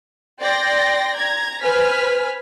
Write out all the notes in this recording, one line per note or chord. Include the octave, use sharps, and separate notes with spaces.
D5 G5 C6 A#6
A#5 G#6
B4 C5 G#5 F6 B6